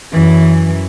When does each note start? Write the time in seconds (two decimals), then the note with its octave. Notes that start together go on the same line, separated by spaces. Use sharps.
0.12 F#2 E3